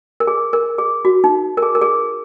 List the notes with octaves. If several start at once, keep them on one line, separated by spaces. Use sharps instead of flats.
A#4
G#4
A#4
G#4
F#4
D#4
A#4
G#4
A#4
G#4